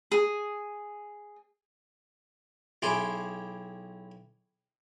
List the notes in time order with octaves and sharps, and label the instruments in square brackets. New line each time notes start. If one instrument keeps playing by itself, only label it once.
[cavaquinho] G#4
[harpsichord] B1 E4 G4 G#4 C6 D6